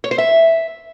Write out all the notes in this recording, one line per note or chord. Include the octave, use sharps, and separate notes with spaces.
C#5
C5
E5